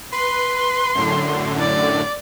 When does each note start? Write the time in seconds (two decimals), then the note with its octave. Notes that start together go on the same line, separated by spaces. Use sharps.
0.12 B4 C6
0.95 F#2 A2 D3
1.59 D5